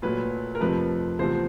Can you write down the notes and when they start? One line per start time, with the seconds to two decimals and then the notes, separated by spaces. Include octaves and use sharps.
0.02 A#2 F#3 A3 B4
0.55 A#4
0.60 F2 C3 F3 A3 B4
1.19 E2 C3 F3 A3 C5